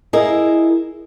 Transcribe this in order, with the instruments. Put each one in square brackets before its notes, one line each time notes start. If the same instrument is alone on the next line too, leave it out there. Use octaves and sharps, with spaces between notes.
[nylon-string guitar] E4 G#4 A#4 D#5